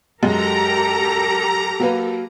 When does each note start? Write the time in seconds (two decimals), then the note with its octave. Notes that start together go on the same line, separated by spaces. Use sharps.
0.23 F#2 G#3 G4 A4 A#4 A#5
1.80 F#3 A#3 B4